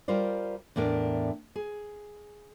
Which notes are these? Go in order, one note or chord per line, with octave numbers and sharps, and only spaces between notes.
G3 F4 A#4 C5 D5
E2 A2 D4 A#4
G#4